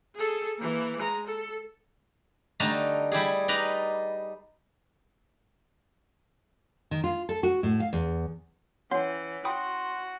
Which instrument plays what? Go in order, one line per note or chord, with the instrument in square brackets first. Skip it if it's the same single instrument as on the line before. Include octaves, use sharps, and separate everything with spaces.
[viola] G#4 A4
E3 A#3
G#3 A#5
A4
[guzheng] D3 G3 A3 D#4 A5 A#5
G3 E4 G4 G#4
D#4 B4 D5 A#5
[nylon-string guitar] D#3
F4
A4
F#4
A2
F5
E2
[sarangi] E3 [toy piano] C#4 C#5 F#5 [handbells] C6
[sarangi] F#4 [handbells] G5 B5 D#6 [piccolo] C6